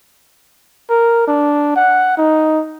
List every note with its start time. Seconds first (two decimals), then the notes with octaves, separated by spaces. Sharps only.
0.90 A#4
1.28 D4
1.76 F#5
2.18 D#4